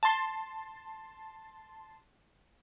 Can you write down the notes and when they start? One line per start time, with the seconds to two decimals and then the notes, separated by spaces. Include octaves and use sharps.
0.03 A5 C6